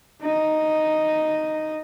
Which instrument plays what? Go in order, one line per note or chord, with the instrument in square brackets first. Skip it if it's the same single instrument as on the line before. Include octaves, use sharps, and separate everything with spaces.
[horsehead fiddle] D#4 D#5